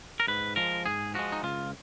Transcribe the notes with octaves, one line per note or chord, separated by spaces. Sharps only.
A#4
G#2 B4
F3 G#3 A#4
G#2 G#4
F3 G#3 F#4
D#4
C#2 F4